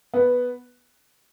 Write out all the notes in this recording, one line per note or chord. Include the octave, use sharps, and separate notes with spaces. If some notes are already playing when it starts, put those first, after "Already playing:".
B3